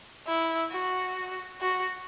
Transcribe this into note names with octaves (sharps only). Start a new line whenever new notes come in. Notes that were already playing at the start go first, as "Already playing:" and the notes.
E4
F#4
F#4